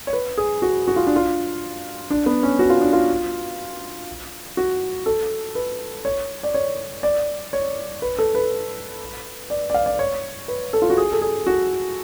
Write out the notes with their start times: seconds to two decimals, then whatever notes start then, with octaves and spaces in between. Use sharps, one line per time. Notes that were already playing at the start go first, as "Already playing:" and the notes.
0.07 C#5
0.13 B4
0.38 G#4
0.62 F#4
0.88 F#4
0.96 F4
1.07 D4
1.16 F4
2.10 D4
2.26 B3
2.43 C#4
2.59 F#4
2.70 F4
2.81 D4
2.93 F4
4.57 F#4
5.06 A4
5.55 B4
6.05 C#5
6.43 D5
6.54 C#5
7.03 D5
7.53 C#5
8.02 B4
8.19 A4
8.35 B4
9.50 D5
9.70 D5
9.74 F5
9.86 D5
9.99 C#5
10.48 B4
10.73 A4
10.82 F4
10.90 F#4
10.97 G#4
11.12 A4
11.22 G#4
11.47 F#4